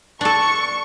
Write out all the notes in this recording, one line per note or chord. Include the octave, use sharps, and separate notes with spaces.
D4 A4 C#6